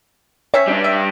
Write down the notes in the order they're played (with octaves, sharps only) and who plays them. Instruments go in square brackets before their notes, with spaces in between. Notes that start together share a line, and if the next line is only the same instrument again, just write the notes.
[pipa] C4 C#4 E5 [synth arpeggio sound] C#5
[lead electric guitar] G3 D4
[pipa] E5